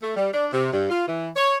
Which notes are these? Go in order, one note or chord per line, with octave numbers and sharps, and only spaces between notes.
A3
G3
D4
C3
G2
F4
E3
C#5